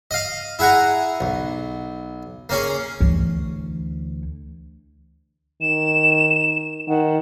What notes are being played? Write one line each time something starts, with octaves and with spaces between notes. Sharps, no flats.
D#5 F5
E4 G#4 F#5 G#5 A#5
B1
A#3 C#4 G#4
D2 E3
D#3 E7
D#3 F#5